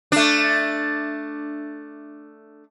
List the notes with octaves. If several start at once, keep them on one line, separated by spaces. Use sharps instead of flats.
A3 D4